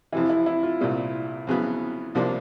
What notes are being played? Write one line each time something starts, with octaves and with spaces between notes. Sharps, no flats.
F2 C3 E3 E4
E4
E4
F4
C2 A#2 G3
F2 C#3 F#3 B3
C2 C3 F3 A#3 D4